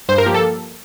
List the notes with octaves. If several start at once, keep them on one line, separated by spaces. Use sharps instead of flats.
G2 C5
A#4
F3 A#3 G4
A4